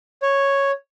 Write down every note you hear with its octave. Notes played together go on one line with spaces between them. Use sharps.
C#5